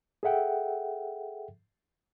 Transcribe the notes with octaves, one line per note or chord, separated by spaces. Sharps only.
G#4 A4 E5 F#5 G5